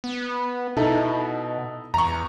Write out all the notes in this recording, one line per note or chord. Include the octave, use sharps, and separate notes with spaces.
B3
B2 D#4 E4 A4
E2 A#5 C#6